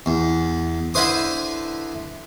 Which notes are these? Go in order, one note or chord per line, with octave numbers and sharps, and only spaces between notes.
E2
D3 E4 B4 C5 D#6